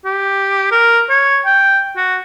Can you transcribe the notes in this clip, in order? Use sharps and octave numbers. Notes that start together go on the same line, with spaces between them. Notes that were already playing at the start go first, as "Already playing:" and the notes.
G4
A#4
C#5
G5
F#4